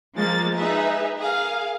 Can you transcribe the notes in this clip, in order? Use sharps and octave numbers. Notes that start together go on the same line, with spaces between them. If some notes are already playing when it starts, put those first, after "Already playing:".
F3 G#3 A#3 A6
D#4 G#4 B4 E5
G#4 A#4 F5